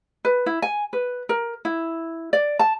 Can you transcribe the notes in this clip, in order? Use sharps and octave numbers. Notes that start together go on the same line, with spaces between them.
B4
E4
G#5
B4
A#4
E4
D5
A5